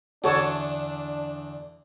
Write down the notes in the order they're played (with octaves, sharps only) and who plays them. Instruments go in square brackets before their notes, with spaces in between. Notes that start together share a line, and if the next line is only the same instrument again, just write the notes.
[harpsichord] E2 D3 A5 [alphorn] D4 [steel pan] F#4 A4 C#5